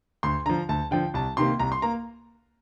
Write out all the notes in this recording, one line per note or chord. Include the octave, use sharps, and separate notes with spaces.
D2 C6
D3 F3 A#5
D2 A5
D3 F3 G5
C2 A5
C3 D#3 A#3 C6
C2 A#5
C6
A#3 A#5